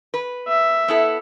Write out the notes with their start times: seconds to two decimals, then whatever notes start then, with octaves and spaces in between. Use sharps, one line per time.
0.14 B4
0.48 E5
0.88 B3 E4 A4